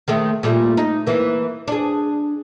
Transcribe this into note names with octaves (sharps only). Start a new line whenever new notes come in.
D#3 G#3 A3
A#2 G3 A3
D#4
E3 A#3
D4 G#4